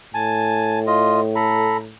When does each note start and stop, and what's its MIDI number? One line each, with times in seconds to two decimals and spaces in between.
0.14 1.96 45
0.14 0.79 80
0.14 0.79 81
0.87 1.20 65
0.87 1.20 75
1.35 1.77 69
1.35 1.77 82
1.35 1.77 83